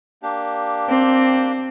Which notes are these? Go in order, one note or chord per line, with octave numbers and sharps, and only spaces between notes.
A#3 D4 G4
C4